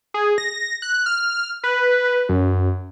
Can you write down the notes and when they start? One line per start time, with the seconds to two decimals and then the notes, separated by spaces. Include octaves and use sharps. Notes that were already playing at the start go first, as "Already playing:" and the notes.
0.14 G#4
0.38 A#6
0.82 F#6
1.06 F6
1.64 B4
2.29 F#2